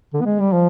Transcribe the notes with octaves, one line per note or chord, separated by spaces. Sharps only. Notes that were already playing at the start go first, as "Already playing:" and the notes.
D3
B3
G#3
G3
F3